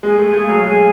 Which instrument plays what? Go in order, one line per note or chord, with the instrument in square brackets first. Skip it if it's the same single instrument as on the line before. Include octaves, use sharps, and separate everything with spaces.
[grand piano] G#3 [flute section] G#4
[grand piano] A3
[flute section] G#4
[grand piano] A3
[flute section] F5
[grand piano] F#3
[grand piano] G#3 [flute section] G#4